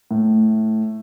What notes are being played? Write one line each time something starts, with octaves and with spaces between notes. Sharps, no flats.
A2